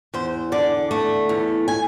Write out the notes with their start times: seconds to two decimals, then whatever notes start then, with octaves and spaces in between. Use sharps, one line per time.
0.14 E2 C5
0.52 D3 D5
0.91 A3
1.29 E2
1.68 G#5